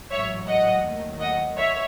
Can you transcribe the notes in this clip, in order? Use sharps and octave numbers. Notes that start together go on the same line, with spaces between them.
A1 G#2 F#3 C#5 E5
D#5 F#5
D#2 D#3 F#3 A3
D#5 F#5
C#5 E5